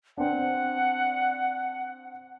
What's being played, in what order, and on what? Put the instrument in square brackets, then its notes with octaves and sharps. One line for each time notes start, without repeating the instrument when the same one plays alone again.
[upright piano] C4 D4 [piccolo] F#5